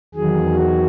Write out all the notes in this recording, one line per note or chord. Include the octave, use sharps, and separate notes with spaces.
E2 D#3 F#3 G#4
F#4